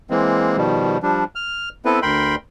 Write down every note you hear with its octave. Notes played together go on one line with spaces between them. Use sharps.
E3 G#3 A#3 C4
B2 D#3 F3 G3
F3 G3 D4
F6
B3 C4 E4 A4 B4
D2 A#4 G5 B5 C6